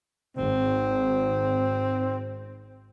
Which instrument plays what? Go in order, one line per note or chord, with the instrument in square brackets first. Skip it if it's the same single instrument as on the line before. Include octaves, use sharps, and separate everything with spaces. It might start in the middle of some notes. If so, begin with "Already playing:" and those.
[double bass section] G#1 [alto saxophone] C4